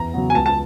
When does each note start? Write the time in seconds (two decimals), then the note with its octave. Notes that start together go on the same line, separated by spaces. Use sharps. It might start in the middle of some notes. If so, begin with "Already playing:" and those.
Already playing: E2 A#5
0.14 C#3 F#3 B3
0.30 G#5
0.35 C#2 A5
0.46 A5